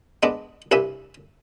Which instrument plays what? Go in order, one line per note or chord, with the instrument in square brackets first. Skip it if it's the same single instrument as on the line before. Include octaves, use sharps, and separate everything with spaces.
[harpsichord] G#3 B3 D4
C2 G2 E4 E5 G#5